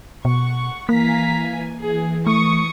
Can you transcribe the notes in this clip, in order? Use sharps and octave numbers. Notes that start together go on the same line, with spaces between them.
B2 F#5 C#6
E3 A#3 F5 G#5 A#5 B6
E3 G#4
A3 C#6 D#6 C#7